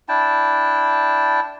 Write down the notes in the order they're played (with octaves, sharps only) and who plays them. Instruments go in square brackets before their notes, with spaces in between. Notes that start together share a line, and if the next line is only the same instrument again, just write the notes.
[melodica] D4 E4 G5 A5